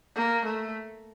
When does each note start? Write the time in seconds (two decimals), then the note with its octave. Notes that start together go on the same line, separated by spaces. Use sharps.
0.15 A#3
0.45 A3